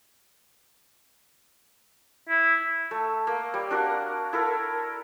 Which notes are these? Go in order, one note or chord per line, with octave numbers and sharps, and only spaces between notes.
E4
A3
A#3
G3
D4 F#4 A#4
E4 A4 A#4